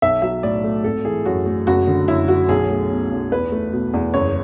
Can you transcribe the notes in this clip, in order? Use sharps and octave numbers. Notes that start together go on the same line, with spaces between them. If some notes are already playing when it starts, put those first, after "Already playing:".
B1 E5
F#3 E5
A2 D5
A3
G#1 A4
E3 G#4
F#2 F#4
A3
F#1 F#4
D3
F#2 E4
F#3 F#4
B1 G#4
A3
B2
B1
E2 B4
A3
B2
E2
F#1 C#5